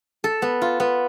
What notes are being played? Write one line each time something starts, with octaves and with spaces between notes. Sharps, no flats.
A4
B3
F4
B3